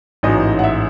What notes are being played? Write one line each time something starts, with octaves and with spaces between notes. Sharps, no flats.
A1 G#2 F#3 D#5
F#5
E5